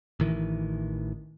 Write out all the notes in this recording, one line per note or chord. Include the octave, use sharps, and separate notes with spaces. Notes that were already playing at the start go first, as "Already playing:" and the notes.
A1 D#3 E3